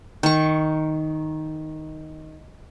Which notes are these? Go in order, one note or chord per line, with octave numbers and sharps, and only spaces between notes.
D#3 C#6